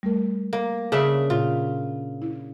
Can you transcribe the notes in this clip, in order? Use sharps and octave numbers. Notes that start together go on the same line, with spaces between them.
G3 A3 A#4
A#3
C#3 D4 E5
A#2 F4
E4